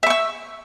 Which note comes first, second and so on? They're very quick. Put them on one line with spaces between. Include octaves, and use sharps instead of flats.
E5 C#6 E6